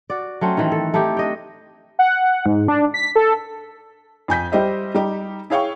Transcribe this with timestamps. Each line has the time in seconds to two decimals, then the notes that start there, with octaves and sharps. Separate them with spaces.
0.10 F#4 D5
0.41 F#3 A3 C4 C#4
0.57 D#3 E3 C4
0.72 A4
0.94 A3 D#4 E4 G4
1.17 D4 D#5 G5
1.99 F#5
2.46 G#2
2.68 D4
2.94 B6
3.16 A4
4.28 F2 G#5 G6 B6
4.52 G3 G4 C5 D#5 E5
4.95 G3 D#4 G4
5.50 E4 G#4 C#5 F5 G5 C#6